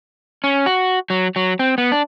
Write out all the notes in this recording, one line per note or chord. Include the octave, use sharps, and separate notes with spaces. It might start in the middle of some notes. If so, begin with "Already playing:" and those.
C#4
F#4
F#3
F#3
C4
B3
D4